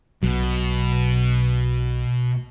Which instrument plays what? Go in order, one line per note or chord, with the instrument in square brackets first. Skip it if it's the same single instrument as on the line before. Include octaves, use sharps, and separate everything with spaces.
[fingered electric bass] B1 F#3 [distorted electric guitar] B2